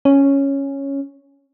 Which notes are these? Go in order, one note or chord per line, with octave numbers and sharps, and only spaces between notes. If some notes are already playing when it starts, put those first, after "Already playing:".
C#4